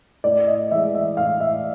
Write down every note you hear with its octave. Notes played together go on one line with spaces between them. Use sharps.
A2 D5
D#5
E3 G#3 E5
E5
A2 F5
E5